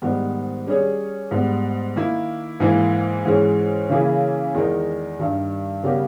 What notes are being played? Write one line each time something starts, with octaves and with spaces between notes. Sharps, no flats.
G#2 D#3 G3 B3
G3 C#4 G#4 C#5
G#2 G3 B3
D#3 A#3 E4
G#2 E3 A#3 E4
G#2 E3 G#3 C#4
C#3 E3 A#3 E4 G#4
E2 D#3 G#3 D#4 A#4
G2 D#3 G3
C#3 G3 B3 G4 A#4